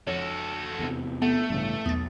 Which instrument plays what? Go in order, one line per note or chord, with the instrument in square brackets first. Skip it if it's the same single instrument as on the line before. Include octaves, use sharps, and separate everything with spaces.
[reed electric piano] F2 [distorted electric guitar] F#4 A4 [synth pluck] C#5
[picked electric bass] E2 C3
[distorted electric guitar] A3 [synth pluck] B3 [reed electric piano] A4
[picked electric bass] A1 [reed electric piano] G2 C#3
[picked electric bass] B1 [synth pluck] E2 A6 [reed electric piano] D#6